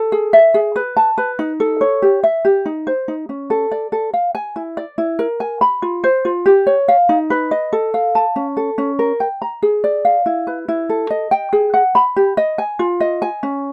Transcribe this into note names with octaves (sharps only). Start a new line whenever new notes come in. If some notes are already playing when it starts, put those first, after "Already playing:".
Already playing: A4
G#4
E5
G#4
B4
A5
B4
D#4
A4
C#5
G4
E5
G4
D#4
C5
D#4
C#4
A4
D5
A4
F5
G#5
E4
D5
E4
A#4
G#5
B5
F4
C5
F4
G4
C#5
F5
D#4
B4
D#5
A4
F5
A5
C#4
A4
C#4
A#4
G5
A#5
G#4
D5
F5
E4
B4
E4
A4
D#5
G5
G#4
F#5
B5
G4
D#5
G#5
F4
D#5
G#5
C#4